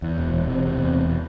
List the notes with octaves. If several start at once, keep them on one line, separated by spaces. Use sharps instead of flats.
E2
E1
E1
C3
C3
E2
E1